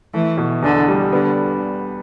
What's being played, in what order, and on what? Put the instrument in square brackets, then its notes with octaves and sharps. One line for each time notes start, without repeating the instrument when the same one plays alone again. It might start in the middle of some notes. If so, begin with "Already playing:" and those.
[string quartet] E3 [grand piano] A3
[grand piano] B2
[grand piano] E2 [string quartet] D3
[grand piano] G3
[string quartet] D3 [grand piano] B3